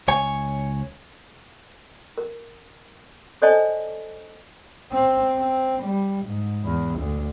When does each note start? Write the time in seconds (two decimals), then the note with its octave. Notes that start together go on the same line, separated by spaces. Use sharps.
0.08 C#2 C#5 G#5
2.18 A#4
3.42 A4 C5 D5 D#5 G#5 A5
4.92 C4
5.39 C4
5.83 G3
6.26 G#2
6.64 E2
6.99 D2